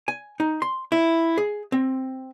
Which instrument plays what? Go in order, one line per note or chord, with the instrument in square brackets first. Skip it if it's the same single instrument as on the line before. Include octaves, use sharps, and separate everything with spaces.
[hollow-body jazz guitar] G#5
D#4
C6
E4
G#4
C4